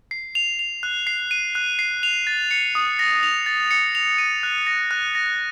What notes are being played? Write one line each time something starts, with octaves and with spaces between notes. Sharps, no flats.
C7
F7
F7
F#6
C7
D#7
F#6
C7
F7
A6
C#7
D#6
A#6
F7
A6
C#7
F7
D#7
F#6
A#6
F#6
A#6